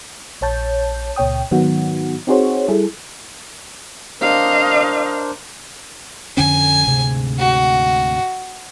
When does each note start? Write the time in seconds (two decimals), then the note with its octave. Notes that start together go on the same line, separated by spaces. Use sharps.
0.41 A#1 C#5 A5 G6
1.16 C#2 A#2 C#5 G5 D#6
1.51 G#2 D#3 F#3 B3 D#4 F#4
2.27 C4 D#4 F#4 G#4 C5 C#5
2.68 G3 E4 G#4 A4
4.21 D4 A#4 C5 D#5 F5
6.37 F2 D3 C#4 G#5
6.87 D2 G#2 C3
7.39 F#4